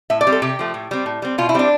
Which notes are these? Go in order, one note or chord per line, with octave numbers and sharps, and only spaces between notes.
A2 E5
D5
G3 C4
A4
C3 G4
F3 A3
A2
G3 C4
A2
G3 C4
B2 F4
E4
G3 C4 D4